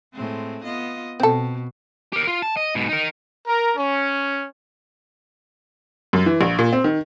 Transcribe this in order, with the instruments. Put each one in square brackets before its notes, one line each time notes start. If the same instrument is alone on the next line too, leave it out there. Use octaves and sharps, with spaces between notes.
[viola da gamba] A2 G#3 C4
B3 F4 D#5
[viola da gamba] B2 [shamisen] C4 A4
[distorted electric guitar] G4 A#4
F4
A5
D#5
G#2 B2
D#4 A#4
[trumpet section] A#4
C#4
[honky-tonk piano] F#2
E3
A#1
A#2
C4
D#3